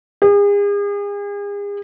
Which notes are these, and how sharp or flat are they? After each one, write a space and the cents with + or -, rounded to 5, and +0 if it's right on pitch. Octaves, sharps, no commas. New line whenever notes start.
G#4 -40